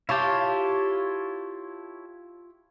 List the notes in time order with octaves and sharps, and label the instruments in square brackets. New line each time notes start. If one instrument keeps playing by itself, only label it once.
[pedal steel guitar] E4 C#5 A5 [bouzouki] F4 G4